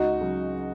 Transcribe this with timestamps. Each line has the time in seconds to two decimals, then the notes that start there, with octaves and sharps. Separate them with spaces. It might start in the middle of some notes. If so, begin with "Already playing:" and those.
Already playing: C#2 D#4 F#4
0.21 C#3 F#3